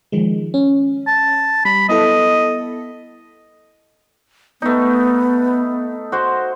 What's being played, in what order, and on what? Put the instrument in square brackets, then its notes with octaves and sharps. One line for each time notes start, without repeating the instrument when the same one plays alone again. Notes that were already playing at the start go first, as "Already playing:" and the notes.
[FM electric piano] D#3 F3 G#3
C#4
[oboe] A5
[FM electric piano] G3 [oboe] B5
[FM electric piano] B3 E4 A4 [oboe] D#5
[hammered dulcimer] A3 D#4 [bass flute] B3
[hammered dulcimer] F#4 C5